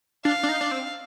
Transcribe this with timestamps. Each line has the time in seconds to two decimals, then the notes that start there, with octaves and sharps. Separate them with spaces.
0.25 D4 F5
0.43 D4
0.49 D#4
0.61 D4
0.71 C4